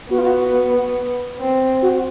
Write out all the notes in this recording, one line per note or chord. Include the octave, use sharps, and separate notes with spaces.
B3 F#4
F4
F#4
C4
F#4